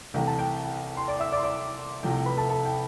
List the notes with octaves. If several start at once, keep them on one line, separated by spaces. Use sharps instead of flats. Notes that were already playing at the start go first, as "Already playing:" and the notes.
C2 C3 E3 A3 G5
A5
G5
C6
D5 D6
E5 E6
D5 D6
C6
D5 D6
C2 C3 F3 A3 E4 G5
G5
B4 B5
A4 A5
A4 A5
G5